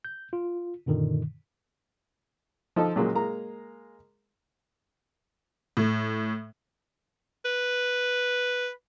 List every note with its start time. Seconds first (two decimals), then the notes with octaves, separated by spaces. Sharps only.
0.05 G6
0.33 F4
0.86 F#2 A#2 D3 D#3
2.76 F3 D#4 A4
2.96 A#2 C#3 F#3 G#3 A#3
3.15 G#3 A#3 A#5
5.77 A2
7.45 B4